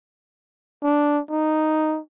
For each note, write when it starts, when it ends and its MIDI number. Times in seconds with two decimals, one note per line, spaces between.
0.83 1.20 62
1.30 1.99 63